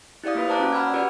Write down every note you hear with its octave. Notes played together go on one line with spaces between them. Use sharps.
E4 G4 D5 F5 D#6
A#3 F4 B4
C5 D5 A5 A#5 D6 F#6
C#4 F#4
F#5 B5 E6 F6 G#6
F4 G4 B4 D5 F#5